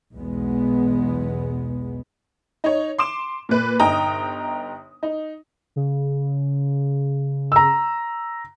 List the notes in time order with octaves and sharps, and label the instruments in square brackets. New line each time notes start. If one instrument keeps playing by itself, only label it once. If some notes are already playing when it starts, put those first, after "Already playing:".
[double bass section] B1 E2 B2 G#3 B3
[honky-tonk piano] D#4 C#5
C6 D6 E7
A#2 B4
G1 D#4 G5 A#5 D#6
D#4
[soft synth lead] C#3
[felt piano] A#5 E6